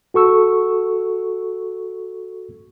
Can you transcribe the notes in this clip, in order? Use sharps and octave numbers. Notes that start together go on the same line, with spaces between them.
F#4 A4 C#6 E6